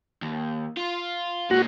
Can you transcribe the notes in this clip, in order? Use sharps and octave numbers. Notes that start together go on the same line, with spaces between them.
D#2
F4
A#2 G#3 F#4